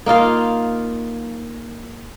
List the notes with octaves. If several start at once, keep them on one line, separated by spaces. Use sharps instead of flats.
A#3 D#4 F4 F5